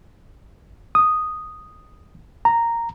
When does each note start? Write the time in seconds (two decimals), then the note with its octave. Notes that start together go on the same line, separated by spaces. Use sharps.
0.95 D#6
2.45 A#5